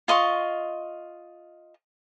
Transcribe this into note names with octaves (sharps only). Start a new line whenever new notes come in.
F4 D#5 C6 C#6